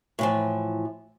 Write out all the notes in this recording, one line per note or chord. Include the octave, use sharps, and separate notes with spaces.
A2 E3 F3